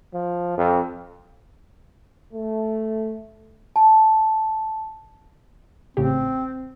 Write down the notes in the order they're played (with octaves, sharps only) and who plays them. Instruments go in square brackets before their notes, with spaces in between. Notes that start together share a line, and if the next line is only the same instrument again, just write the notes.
[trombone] F3
F2
[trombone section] A3
[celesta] A5
[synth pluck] A1 C#3 G4 [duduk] C4